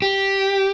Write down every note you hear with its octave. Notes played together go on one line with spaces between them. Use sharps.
G4